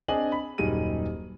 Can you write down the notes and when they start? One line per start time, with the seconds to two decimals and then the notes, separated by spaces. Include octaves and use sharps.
0.08 C4 D4 G#4 D#5 G#5 F#7
0.32 B5
0.58 D#1 F#2 G3 D#4 G#4 D#7